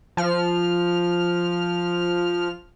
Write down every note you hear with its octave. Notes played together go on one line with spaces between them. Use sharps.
F3 F6